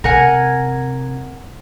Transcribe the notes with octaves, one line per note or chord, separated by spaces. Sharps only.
C3 A#4 F#5 G#5